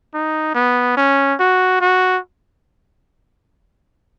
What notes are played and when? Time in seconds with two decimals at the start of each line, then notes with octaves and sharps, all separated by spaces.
0.14 D#4
0.55 B3
0.97 C#4
1.40 F#4
1.81 F#4